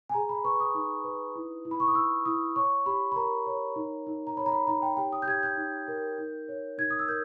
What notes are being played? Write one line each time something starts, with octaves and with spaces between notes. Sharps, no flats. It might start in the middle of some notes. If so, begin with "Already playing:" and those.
G#5
G#4 A#5
B5
B4 C#6
D#6
D#4
B4
E4
E4
B5
C#6
D#6
E4 E6
E4 D#6
C#5 C#6
G4 B5
B5
A#4 A#5
C#5
D#4
D#4
A#5
C#5 B5
A#5
B5
D#4 A#5
G5
G4 G5
D#6
G6
G4 G#6
G6
D#4
A#4
D#4
C#5
D#4 G#6
D#6
E6
A#4 G6